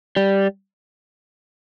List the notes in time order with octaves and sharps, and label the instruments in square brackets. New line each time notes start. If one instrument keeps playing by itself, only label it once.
[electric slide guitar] G3